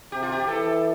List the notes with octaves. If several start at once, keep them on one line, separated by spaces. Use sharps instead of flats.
C3 G4
F4
G4
E3 A4